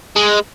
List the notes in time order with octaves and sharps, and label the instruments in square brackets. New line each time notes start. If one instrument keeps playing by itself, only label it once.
[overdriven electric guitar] G#3